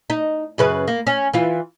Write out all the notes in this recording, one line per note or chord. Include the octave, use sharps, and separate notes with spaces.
D#4
F#2 C#3 B4
A#3
C#4
E3 F4